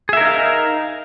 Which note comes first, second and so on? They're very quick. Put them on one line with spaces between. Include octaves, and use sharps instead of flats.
G#4 E5 A#4 D#4 F5